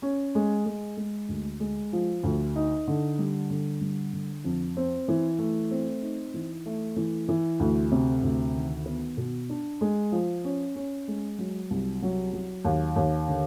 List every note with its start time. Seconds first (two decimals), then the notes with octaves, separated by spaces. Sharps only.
0.02 C#4
0.35 G#3
0.66 G#3
0.97 G#3
1.29 D2
1.60 G#3
1.93 F3
2.23 D2
2.56 D#4
2.87 D3
3.19 G3
3.50 D3
3.81 G3
4.13 D3
4.44 F2
4.77 C4
5.08 E3
5.39 A3
5.71 C4
6.02 D#4
6.34 E3
6.66 A3
6.96 E3
7.28 E3
7.60 D2
7.92 C3
8.23 D2
8.55 D#3
8.86 B3
9.17 B2
9.50 D4
9.81 G#3
10.12 F3
10.44 C#4
10.76 C#4
11.08 G#3
11.39 F#3
11.70 C2
12.02 F#3
12.33 F#3
12.64 D#2
12.96 D#2
13.28 D3